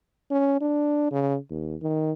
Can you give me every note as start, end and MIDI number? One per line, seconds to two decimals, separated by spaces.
0.31 0.57 61
0.61 1.10 62
1.11 1.37 49
1.50 1.75 39
1.81 2.12 51